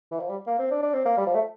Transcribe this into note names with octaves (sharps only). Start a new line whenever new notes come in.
E3
F3
G3
A#3
C4
D4
D4
C4
A#3
G3
F3
A3